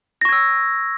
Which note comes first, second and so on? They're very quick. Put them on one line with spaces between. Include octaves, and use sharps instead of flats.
A#6 C#6 G#6 E6